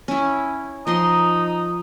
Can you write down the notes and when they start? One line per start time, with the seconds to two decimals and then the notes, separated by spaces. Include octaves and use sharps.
0.08 C#4 E4
0.87 F3 D#4 D#5 C6